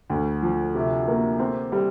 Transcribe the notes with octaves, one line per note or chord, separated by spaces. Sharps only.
D2
F3
C3
A#3
C4
G3